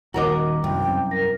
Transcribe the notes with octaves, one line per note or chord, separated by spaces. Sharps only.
D#1 D#3 F#4 A#4 D#5 A#5 D6
C2 F#2 F#3 G5
F#2 C3 C4
A#4 A#6